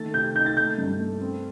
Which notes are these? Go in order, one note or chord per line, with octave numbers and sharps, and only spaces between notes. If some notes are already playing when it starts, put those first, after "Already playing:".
Already playing: D#3 A3 A6
C3 G6
D#4 G6
A6
A3 G6
G2
A3
C4